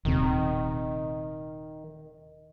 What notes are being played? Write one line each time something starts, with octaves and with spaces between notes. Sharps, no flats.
D#1 C3 D#3